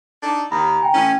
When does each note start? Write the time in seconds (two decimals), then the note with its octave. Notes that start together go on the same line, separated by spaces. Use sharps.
0.23 D4 D#4 A4
0.51 D#2 A#5 B5
0.82 G5 G#5
0.94 A2 E3 C#4